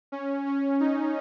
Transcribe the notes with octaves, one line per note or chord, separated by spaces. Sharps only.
C#4
C#4
D#4